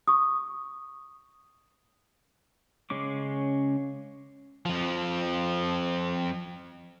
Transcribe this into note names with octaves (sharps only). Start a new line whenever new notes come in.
C#6 D#6
C#3 G#3 C#4 D6
F2 F3